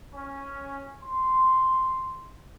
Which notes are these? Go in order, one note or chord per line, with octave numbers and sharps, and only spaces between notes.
C#4
C6